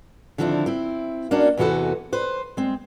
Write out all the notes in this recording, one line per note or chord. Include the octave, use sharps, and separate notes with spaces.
D3 D#3 F3 C4 D4 E4
C4 E4
A#3 C#4 D4 F#4
E2 C3 E3 F#4 A4 B4
B4 C5
G#3 C4